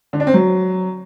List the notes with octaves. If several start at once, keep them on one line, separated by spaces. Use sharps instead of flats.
D3
D4
C4
F#3